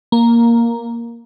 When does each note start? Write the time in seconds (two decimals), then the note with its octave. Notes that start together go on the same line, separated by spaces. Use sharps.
0.12 A#3